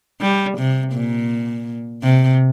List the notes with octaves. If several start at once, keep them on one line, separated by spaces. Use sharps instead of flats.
G3
C3
A#2
C3